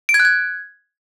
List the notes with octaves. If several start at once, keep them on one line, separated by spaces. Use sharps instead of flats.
D7
G#6
F#6
G#6